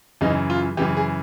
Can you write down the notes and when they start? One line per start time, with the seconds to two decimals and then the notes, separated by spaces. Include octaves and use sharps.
0.21 F#2 C#3 E3 D#4
0.50 F4
0.77 F#2 C#3 E3 G4
0.97 G#4